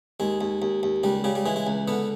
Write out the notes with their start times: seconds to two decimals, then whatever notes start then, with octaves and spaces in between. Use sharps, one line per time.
0.20 D#2 G#3
0.41 D#2
0.62 D#2
0.83 D#2
1.03 C#2 G3
1.24 C#3 G3
1.35 G3
1.46 E3 G#3
1.56 G#3
1.67 C#2
1.88 D3 B3